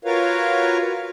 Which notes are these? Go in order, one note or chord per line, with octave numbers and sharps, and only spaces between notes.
F4 F#4 A#4 B4 C#5 F5